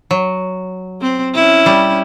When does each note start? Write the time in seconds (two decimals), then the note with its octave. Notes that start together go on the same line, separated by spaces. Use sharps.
0.11 F#3
1.01 C4
1.35 C#4 E4
1.66 G3